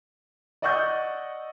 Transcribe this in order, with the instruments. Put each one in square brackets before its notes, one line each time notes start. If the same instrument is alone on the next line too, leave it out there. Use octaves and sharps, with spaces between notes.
[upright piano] D5 D#5 F#5 C#6 E6 G6